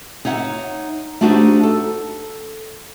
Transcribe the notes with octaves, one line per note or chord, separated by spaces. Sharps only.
D#4 C#5 E5 F#5
A3 D4 D#4 F#4 G4 C5
A4